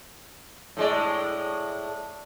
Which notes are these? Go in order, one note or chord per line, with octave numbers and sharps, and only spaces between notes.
A2 G#3 D5